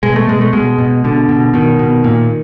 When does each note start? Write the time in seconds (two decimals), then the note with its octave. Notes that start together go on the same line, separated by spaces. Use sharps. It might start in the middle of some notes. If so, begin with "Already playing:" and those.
0.03 B2 G#3
0.16 A3
0.28 B2 G#3
0.41 A3
0.53 B2 G#3
0.79 B2
1.04 B2 D3
1.29 B2
1.54 B2 D#3
1.79 B2
2.04 A#2